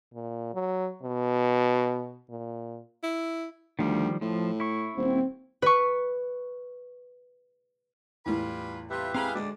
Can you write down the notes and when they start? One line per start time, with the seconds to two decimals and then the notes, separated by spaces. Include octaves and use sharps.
0.14 A#2
0.54 F#3
1.03 B2
2.30 A#2
3.03 E4
3.79 D2 D#3 F3 G3
4.21 A2 F3
4.60 E4 C#6
4.97 D#1 C4
5.62 B4 C#6
8.26 E2 A2 G3 F4 B4
8.90 C3 G3 F4 G4 B4 E5
9.15 G#3 C4 F5 A#5 B5
9.35 D2 G#3 D5